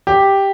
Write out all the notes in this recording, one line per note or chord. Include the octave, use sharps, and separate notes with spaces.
G4